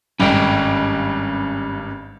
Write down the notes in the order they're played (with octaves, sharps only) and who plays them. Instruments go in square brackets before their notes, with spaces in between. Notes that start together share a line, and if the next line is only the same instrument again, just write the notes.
[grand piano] G#1 G2 [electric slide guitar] C#4 D#5 G5